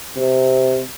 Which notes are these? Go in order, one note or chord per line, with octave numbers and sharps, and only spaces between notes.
C3